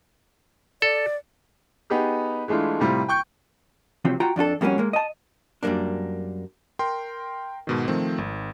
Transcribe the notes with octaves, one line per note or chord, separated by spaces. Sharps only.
A4 D5
B3 D#4 G4 G#4
E3 G#3 A3 D4 F4
A2 C3 G3 C4 F4
G5 C#6 G6
C3 F3 F#3 C4
F4 F#4 G5 A#5
F2 D4 F4 A4
F2 G3 A#3 C4 C#4 F#4
G#3 A#3
D#5 A5
F#2 G3 G#3 A#3 D4
A#4 G5 C6
G#2 B2 D#3
D#3 F3 A3 C4
G#1